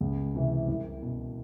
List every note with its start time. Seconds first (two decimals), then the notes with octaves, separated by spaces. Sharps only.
0.01 C#2
0.34 C3 E3
0.67 C2
1.02 B2